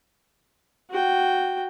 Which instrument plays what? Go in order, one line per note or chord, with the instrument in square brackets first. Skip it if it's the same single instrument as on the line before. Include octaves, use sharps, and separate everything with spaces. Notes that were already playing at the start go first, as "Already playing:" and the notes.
[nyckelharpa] F#4 G5